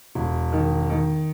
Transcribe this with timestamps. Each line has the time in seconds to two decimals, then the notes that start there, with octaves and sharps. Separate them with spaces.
0.15 E1
0.52 D#3
0.90 D#3